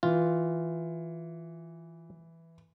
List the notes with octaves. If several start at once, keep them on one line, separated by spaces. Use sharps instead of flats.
E3 F4